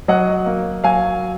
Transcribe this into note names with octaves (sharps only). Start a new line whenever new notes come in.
F#3 D#5 F#5
A#3
F#3 F5 G#5